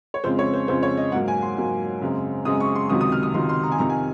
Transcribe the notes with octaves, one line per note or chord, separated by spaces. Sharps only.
C#5
F2 C#3 G#3 C4 C5
C#5
C5
F2 C#3 G#3 C4 C5
C#5
D#5
G#2 F#3 A#3 F#5
G#5
C6
G#2 F#3 A#3
F#2 C#3 G#3 C4
F#2 C#3 G#3 C4 D#6
C#6
C6
C#2 C3 D#3 F#3 D#6
D#6
F6
D#6
C#2 C3 D#3 F#3 C6
C6
A#5
G#5
F2 C3 D#3 A#5
G#5